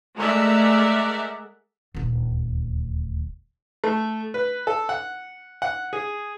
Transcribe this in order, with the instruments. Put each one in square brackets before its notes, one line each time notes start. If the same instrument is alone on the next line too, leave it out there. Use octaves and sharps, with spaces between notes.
[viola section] G#3 A3 A#4 D5 E5 F#5
[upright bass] D#1 D2
[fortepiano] A3
B4
A4
F#5
F#5
G#4